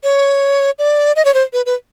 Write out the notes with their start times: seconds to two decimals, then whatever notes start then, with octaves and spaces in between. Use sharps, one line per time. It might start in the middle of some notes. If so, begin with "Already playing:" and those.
0.04 C#5
0.79 D5
1.16 D#5
1.25 C#5
1.34 C5
1.53 B4
1.66 B4